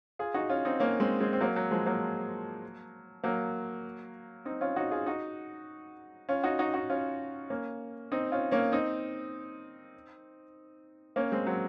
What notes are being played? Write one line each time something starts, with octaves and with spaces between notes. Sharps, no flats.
F4 G#4
D#4 F#4
C#4 F4
C4 D#4
A#3 C#4
G#3 C4
G#3 C4
C4
F#3 A#3
F#3
F3 G#3
F#3 A#3
F#3 A#3
C4 D#4
C#4 F4
D#4 F#4
F4 G#4
D#4 F#4
C#4 F4
D#4 F#4
D#4 F#4
D#4 F#4
C#4 F4
A#3 C#4
C4 D#4
C#4 F4
A#3 C#4
C4 D#4
A#3 C#4
G#3 C4
F#3